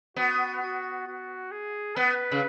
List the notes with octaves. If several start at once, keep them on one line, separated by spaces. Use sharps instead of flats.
B3 F#4
F#4
F#4
G#4
B3 B4
C#3